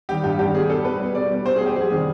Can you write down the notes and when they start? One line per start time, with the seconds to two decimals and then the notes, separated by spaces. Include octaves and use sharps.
0.09 D#3 G3 G4
0.24 G2 G4
0.39 D#3 G3 G4
0.55 B2 G#4
0.69 G3 A4
0.85 B2 B4
1.00 G3
1.15 B2 D5
1.31 G3
1.45 B2 C5
1.56 G#4
1.61 G3 G4
1.76 F2 G#4
1.91 C3 D#3 G3